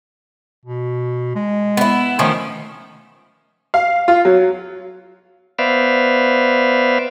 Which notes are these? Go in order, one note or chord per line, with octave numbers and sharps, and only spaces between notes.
B2
G#3
B3 E4
D#3 F3 A3 C#4
F5
F4
F#3
B3 B4 C5 D5 E5 F5